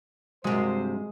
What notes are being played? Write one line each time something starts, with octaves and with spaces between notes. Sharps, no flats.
G2 C3 F#3 G#3 F#4 C5